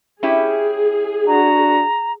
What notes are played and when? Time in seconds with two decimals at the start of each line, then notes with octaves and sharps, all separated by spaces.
0.23 C#4 E4 G4 G#4
1.27 D4 F#4 A#5